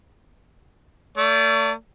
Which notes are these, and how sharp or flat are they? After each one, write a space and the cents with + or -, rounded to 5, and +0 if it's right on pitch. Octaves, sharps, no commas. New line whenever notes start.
A3 +35 D5 -30